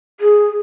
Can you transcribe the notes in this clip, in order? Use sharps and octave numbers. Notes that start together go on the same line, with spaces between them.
G#4